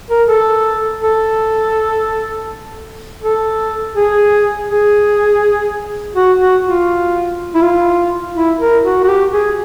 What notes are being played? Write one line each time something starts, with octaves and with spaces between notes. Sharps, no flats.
A#4
A4
A4
A4
G#4
G#4
F#4
F#4
F4
E4
F4
E4
A#4
F#4
F#4
G4
G#4